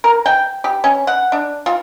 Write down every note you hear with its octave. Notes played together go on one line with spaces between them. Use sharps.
A#4
G5
G4
C#4
F#5
D4
F4